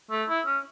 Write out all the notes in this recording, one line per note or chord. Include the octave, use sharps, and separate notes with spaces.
A3
E4
C#4